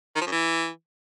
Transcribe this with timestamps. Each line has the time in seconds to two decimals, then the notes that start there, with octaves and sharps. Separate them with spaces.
0.16 D#3
0.21 F3
0.27 F#2
0.32 E3